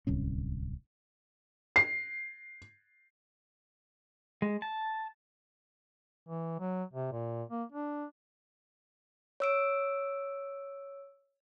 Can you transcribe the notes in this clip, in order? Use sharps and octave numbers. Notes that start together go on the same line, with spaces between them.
D1 C2 C#4
C7
G#3
A5
E3
F#3
C3
A#2
A#3
D4
C#5 E6 D7